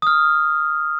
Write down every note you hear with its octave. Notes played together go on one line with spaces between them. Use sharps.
D#6 F6